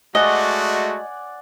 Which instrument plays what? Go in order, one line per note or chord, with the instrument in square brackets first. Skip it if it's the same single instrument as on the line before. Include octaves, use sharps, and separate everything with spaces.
[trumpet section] G#3 A3 F#4 [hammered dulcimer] D5 F#5 G#5 [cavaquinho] D#5